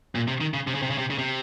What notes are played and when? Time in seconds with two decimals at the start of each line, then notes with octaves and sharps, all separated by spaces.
0.15 A#2
0.28 C3
0.41 D#3
0.54 C#3
0.67 C3
0.75 C#3
0.82 C3
0.90 C#3
0.98 C3
1.10 C#3
1.18 C3